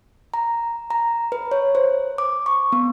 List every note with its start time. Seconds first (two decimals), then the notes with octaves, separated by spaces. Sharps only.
0.34 A#5
0.90 A#5
1.32 B4
1.51 C#5
1.75 C5
2.18 D6
2.46 C#6
2.72 B3